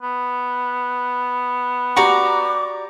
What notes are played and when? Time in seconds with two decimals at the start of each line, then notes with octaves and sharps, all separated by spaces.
0.02 B3
1.97 F#4 G4 D5 A#5 C#6 D6